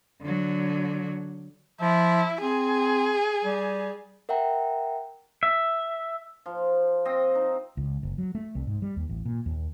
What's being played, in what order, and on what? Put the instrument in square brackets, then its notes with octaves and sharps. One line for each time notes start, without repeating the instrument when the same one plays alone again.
[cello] D3 F#3
[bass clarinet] F3 [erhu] E4
[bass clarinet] C4 [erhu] G#4
[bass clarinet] G3
[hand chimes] A#4 E5 F#5 G5 A#5
[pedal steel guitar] E5
[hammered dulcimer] F3
C4 D#5
D#4
[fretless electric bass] C#2
F#1
F#3
A3
C2
G#2
G3
D#2
A1
A#2
D#2